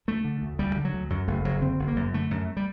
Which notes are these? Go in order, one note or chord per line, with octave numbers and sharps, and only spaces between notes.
D2 A3
D3
D2
D2 G3
D3
F#3
D2
F#2 F#3
F#1 A3
F#1 F#3
D3 C4
F#1
A#3
F#2
D3 A3
F#2
G3